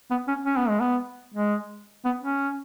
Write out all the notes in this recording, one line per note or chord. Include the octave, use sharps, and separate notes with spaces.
B3
C#4
C#4
B3
G#3
B3
G#3
B3
C#4